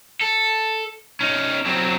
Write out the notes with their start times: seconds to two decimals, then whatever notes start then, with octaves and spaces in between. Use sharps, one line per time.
0.21 A4
1.21 C#4 D#4
1.66 F#3 C4